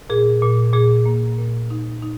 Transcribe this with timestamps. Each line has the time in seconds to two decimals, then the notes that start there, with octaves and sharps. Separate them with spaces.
0.10 A#2 G#4
0.42 A#2
0.73 A#2 G#4
1.06 A#3
1.38 A#2
1.71 D#4
2.02 D#4